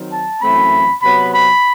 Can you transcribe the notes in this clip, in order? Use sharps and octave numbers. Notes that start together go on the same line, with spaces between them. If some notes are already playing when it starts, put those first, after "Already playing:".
Already playing: D#3 F#3 C4
A5
F#2 E3 A3 C4 B5
C3 F#3 B3 B5
B5